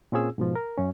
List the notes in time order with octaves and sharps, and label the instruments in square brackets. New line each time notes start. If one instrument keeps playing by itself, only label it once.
[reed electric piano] A#2 C4 C#4 F4 G#4 E6
G#2 B2 F3
A#4
F#2 C#4